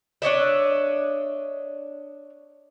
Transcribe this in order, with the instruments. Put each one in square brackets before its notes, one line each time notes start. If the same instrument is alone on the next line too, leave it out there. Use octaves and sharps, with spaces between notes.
[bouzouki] D4 C#5 D#5 E5